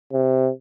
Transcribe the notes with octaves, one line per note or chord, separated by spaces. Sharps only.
C3